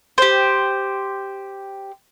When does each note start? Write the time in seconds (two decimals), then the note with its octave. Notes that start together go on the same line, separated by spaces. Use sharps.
0.18 G4 C5